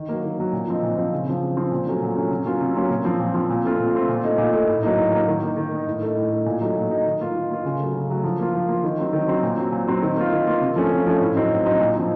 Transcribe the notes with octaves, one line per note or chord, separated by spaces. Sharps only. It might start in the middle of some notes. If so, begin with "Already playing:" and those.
Already playing: D#3
F#3 A#3
D#3
F#3 A#3
A#2
F3 C4 D#4
A#2
F3 C4 D#4
C#3
F3 C4
C#3
F3 C4
A#2
F#3 A3 C#4
A#2
F#3 A3 C#4
C3
F#3 A#3 C#4 F4
C3
F#3 A#3 C#4 F4
A#2
F3 C4
A#2
F3 C4
A#2
A3 C4 F4
A#2
A3 C4 F4
A#2
A3 D#4
A#2
A3 D#4
A2
F#3 A#3 D#4
A2
F#3 A#3 D#4
D#3
A#3 D#4
D#3
A#3 D#4
A2
A3 D#4
A2
A3 D#4
A#2
F#3 A3 D#4
A#2
F#3 A3 D#4
D#3
A#3 F4
D#3
A#3 F4
C#3
F#3 A3
C#3
F#3 A3
F3
A#3 F4
F3
A#3 F4
D#3
F#3 C4
D#3
F#3 C4
A#2
F#3 C4
A#2
F#3 C4
D#3
A#3 F4
D#3
A#3 F4
C3
F3 A3 C#4
C3
F3 A3 C#4
A2
F#3 C4 D#4
A2
F#3 C4 D#4
A#2
F3 C4 D#4